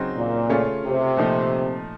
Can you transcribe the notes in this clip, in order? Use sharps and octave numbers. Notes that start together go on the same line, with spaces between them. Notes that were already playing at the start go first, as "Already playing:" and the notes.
Already playing: C#3 F#3 C4 D#4
A#2
C#3 A3 C#4 F4
C3
A#2 F3 A3 D#4